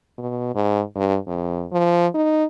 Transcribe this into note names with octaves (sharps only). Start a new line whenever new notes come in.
B2
G#2
G2
F2
F3
D#4